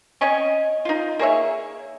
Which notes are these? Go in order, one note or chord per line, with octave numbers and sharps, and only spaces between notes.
C4 C#4 C#5 D#5
D#4 F4
A#3 G#4 C#5 E5